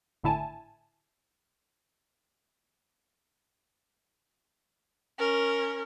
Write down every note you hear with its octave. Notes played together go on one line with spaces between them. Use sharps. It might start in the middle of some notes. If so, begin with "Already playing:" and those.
G#1 A2 D3 E4 G#5 A5
C#4 A#4